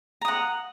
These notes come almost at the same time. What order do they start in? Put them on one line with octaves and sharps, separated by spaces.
A#5 D#6 F#5